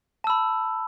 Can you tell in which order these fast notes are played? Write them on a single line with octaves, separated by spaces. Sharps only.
A5 E6 B5